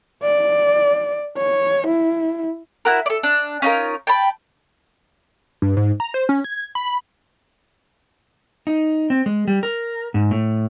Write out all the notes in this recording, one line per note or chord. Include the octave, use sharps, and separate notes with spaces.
D5
C#5
E4
E4 F#4 A#4
A4 D5
D4
C#4 D#4 F4 A#4
G5 A5 B5
G2
G#2
A#5
C5
C#4
G#6
B5
D#4
C4
G#3
G3
A#4
G#2
A2